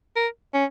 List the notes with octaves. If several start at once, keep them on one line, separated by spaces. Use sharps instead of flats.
A#4
C#4